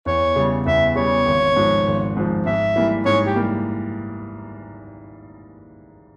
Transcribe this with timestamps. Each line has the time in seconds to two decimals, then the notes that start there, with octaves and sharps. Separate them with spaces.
0.06 E2 C#5
0.36 C#3 G3
0.66 E2 E5
0.96 C#3 G3 C#5
1.26 G#1
1.56 G#2 F3
1.87 G#1
2.17 G#2 F3
2.46 G#2 E5
2.76 E3 G3 A#3
3.06 G#2 C#5
3.26 G4
3.36 E3 G3 A#3